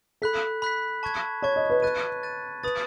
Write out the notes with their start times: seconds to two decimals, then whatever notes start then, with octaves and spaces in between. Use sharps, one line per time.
0.22 A4 B5 F#6 B6
0.62 B5 F#6 B6
1.03 A5 C#6 G#6
1.42 C#5 A5 C#6 G#6
1.56 D#5
1.70 B4
1.82 B4 F#6 A6 D#7
2.23 F#6 A6 D#7
2.63 B4 B5 D#6 A6